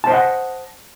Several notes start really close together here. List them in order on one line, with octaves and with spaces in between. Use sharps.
A5 C5 D#5 F#5